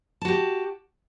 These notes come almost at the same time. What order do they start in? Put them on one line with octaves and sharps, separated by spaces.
A5 F#4 G4